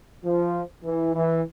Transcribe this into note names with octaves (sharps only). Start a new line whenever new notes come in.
F3
E3
E3